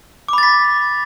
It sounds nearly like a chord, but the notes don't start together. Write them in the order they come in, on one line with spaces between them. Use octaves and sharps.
D6 B5 A6 B6